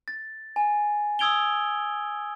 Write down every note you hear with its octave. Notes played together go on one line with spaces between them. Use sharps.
A6
G#5
D#6 E6 G#6 D7 F7 G7